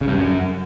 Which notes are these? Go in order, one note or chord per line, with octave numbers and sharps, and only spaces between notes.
C#3
G2
F#2